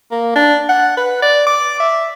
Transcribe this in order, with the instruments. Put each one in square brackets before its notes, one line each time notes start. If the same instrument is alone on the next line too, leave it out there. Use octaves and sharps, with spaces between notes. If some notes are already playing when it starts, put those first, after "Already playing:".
[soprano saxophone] A#3
D4
F#5
B4
D5
D6
E5